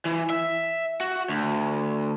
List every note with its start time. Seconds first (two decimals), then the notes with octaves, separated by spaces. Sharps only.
0.05 E3
0.30 E5
1.01 F#4
1.29 D2